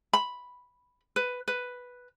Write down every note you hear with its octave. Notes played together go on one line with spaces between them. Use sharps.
B5
B4
B4